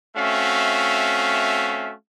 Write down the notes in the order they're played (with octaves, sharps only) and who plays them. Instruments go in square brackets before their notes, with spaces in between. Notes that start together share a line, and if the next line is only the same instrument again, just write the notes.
[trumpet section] A3 C4 C#4 F#4 E5 F5